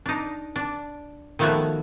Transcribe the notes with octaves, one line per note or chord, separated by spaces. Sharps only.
D4 D#4
D4
D#3 F3 A3 B3 F#4 C#5